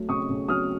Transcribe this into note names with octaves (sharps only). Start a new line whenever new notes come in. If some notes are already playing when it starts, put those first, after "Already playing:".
Already playing: F#3 A3
C#3 C#6 D#6
C#3
F#3 D#6 F6